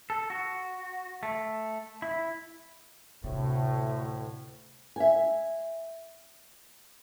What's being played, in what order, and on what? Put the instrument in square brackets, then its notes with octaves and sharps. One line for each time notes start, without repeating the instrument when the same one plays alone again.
[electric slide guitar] A4
F#4
A3
E4
[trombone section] D2 A2 [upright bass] C3
[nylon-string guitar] E5 G#5